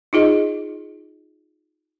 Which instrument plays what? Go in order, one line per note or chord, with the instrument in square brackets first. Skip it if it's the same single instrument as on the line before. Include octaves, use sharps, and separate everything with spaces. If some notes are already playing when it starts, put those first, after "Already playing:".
[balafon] D#4 F4 G#4 D#5